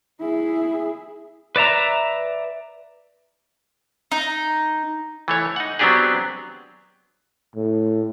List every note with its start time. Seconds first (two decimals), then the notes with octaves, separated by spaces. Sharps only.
0.20 E4 G#4
1.56 B4 D5 E5 A#5
4.12 D#4
5.28 E3 A3 C#5
5.56 D#4 F#5
5.79 F#3 B3 C4 D4 G4 G#4
7.56 A2